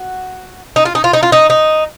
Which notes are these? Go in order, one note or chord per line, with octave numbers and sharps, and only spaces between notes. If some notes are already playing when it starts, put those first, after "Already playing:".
Already playing: F#4
D#4
F4
D#4
F4
D#4
F4
D#4
D#4